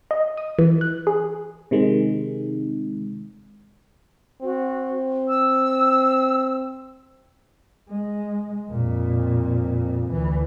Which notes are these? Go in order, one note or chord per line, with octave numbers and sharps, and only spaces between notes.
D#5
D#6
E3
F#6
G#4
C3 D#3 G#3
C4 F#4
E6
G#3
F2 A#2
D2 E3